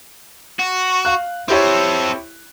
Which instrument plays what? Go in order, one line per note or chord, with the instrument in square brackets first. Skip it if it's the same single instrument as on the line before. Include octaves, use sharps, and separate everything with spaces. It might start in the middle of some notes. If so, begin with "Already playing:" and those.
[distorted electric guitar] F#4
[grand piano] F5 F#6
[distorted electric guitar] C4 A4 [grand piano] E4 G4 C#5